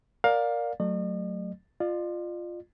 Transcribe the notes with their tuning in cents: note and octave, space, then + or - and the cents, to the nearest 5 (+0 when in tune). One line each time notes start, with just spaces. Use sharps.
A#4 +0 D5 +0 F5 +20
F#3 +0 A3 +0 D#5 -45
F4 +0 D5 +45